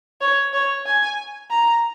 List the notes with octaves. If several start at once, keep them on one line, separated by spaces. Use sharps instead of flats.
C#5
C#5
G#5
A#5